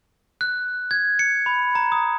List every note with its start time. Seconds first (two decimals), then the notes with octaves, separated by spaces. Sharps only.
0.41 F#6
0.91 G#6
1.19 C#7
1.46 B5
1.75 A#5
1.92 D#6